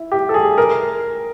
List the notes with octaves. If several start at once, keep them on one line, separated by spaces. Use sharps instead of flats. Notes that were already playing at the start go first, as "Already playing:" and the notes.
Already playing: E4
G4
A4
G#4
A#4